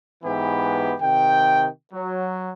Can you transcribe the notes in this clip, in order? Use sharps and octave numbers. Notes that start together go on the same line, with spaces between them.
G#2 E3 B3 E4 G4
C3 D#3 G5
F#3